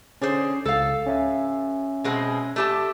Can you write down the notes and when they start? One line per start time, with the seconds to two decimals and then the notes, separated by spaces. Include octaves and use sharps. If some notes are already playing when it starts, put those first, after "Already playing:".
0.22 D3 C#4 G#4 C5
0.65 C#2 A4 F5
1.07 C#4 E5 G#5
2.04 B2 G#3 C4
2.56 A3 G4 A5